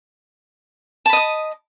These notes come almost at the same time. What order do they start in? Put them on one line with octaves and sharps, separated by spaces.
A5 B5 D#5 D#6